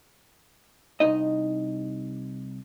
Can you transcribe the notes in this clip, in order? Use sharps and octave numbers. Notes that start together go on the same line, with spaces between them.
C2 D#4 D#5